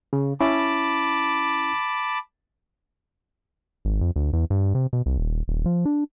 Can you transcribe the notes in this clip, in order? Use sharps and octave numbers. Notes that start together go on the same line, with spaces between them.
C#3
C#4 E4 A5 B5 D6
G#1
F2
D2
E2
G2
C3
B2
C2
D#1
D#1
F3
D4